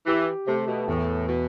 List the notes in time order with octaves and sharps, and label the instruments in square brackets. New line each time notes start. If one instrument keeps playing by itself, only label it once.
[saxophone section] E3 [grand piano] G4
[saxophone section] C3 [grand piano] A3
[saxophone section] B2
[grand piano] E2 [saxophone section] A2
[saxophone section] B2